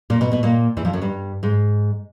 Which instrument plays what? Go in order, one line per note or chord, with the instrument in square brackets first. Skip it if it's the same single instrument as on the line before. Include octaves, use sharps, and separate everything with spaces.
[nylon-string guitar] A#2 A#3
B2 B3
B2 B3
A#2 A#3
E2 E3
F2 F3
F#2 F#3
G2 G3
G#2 G#3